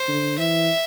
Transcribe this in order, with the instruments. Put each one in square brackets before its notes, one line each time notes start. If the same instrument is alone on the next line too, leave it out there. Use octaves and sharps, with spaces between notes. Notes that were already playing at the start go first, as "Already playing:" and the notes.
Already playing: [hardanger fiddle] C5
[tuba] D3
[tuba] E3 [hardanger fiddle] E5